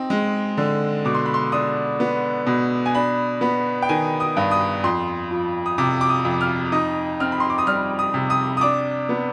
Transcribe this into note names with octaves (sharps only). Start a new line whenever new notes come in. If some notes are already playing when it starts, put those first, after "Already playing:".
Already playing: C4 D#4
G#3
D3
B2 D6
C6
B5
C6
D4 D#6
B3
B2
G#5
D4 B5
B3 B5
G5
D#3 G#5
D#6
G2
D#6
F2 C6
F3
D#6
C3 D6
D6
D#6
F2
F6
D#4 D#6
C4 F6
B5
C6
D6
D#6
G3 F6
D#6
C3
D#6
D#6
D4 D6
B3